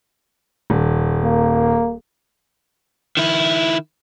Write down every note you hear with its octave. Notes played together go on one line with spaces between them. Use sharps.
D#1
A#3
D#3 E4